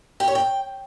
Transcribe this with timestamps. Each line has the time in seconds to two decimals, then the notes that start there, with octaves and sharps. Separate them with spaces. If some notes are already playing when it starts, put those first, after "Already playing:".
0.20 G4
0.28 C#5
0.35 G5